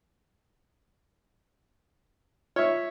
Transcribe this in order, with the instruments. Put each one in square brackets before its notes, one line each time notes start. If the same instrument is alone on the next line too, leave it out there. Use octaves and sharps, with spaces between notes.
[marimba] F4 [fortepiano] C#5 E5